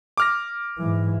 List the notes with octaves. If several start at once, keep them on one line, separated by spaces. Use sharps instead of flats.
D6 F6 A#6
G#2 E3